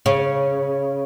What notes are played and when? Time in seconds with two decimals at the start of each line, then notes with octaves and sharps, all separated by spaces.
0.06 C#3